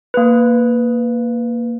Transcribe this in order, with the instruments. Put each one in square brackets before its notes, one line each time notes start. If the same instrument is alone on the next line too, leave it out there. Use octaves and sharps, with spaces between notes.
[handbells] A#3 B4